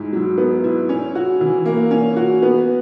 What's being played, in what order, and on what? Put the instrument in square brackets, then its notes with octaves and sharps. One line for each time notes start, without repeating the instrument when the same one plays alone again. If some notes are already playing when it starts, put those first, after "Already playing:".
Already playing: [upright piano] G#2 E4
F#3
B3
E4
C#4
F#4
E3
A#3
C#4
F#4
B3